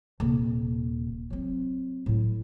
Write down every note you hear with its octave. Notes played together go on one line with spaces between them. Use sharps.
D#1 C3
F#3 C4
A2 E4